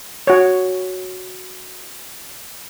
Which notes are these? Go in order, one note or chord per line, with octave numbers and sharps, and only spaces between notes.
F#4 C#5